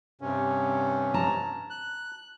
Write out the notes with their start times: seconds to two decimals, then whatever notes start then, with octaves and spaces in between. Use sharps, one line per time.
0.21 G2 C3 C#4
1.14 A5 A#5
1.70 F#6